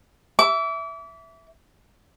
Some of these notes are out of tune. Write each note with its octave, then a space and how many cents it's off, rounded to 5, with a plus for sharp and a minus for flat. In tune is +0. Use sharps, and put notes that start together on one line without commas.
E5 +0 D6 -35